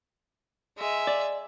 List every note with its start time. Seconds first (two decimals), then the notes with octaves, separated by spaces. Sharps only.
0.78 G#3 E5
1.07 D5